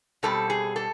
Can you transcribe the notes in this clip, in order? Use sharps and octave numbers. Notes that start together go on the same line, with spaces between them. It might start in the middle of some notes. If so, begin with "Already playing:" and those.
B2 G3 C4 A4
G#4
A4